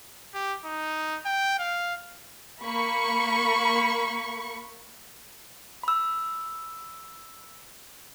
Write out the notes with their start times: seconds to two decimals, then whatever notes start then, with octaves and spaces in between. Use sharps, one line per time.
0.34 G4
0.65 D#4
1.25 G5
1.59 F5
2.62 A#3 B5 C#6
5.83 B5 E6